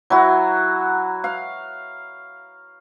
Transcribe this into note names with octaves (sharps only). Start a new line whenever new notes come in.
F#3 E4 F#4
F5